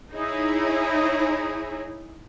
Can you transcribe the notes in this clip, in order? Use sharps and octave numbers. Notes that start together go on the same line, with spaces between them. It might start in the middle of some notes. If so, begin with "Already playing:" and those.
D#4 E4 G#4 C#5